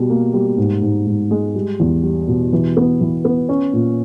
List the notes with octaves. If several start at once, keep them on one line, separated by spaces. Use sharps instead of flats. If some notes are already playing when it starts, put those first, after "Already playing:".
Already playing: B2 G3
A#3
G3
G#2
G#2
G#2
G#3
G3
E2
G3
B2
E3
B3
E3
B3
C#4
A#2